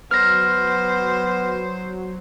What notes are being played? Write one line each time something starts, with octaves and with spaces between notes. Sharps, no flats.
F#3 B3 C5 F6 A#6